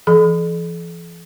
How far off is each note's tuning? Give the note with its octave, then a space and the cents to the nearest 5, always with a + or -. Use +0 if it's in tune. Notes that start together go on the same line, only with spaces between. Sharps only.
E3 +45 A4 -45 B5 +35